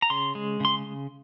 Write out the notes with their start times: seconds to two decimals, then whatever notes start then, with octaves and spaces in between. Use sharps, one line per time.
0.02 A#5
0.10 C#3 C6
0.35 G#3
0.60 C#3 C6